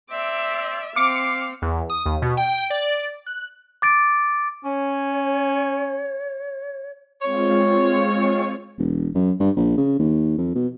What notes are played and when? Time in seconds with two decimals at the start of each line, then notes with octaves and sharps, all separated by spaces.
0.11 C4 D5 E5
0.96 C4 F5 D6 C#7
1.62 E2
1.90 D#6
2.06 D#2
2.22 B2
2.37 G5
2.70 D5
3.26 F#6
3.82 D6 A6 D7
4.64 C#4 C#5
7.22 G#3 C4 F4 C#5
8.79 E1
9.15 F#2
9.40 G2
9.57 A#1
9.78 C#3
9.99 D#2
10.38 F2
10.56 B2